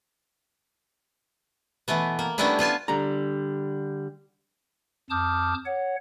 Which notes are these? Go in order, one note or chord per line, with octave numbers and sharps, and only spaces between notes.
B2 E3 A3 B3
A#3
G3 A3 B3 C#4 D4 E4
B3 F4 G#5 A5
D3 G3 A#5
F2 A5 D6 D#6 F6 G6
C#5 F#5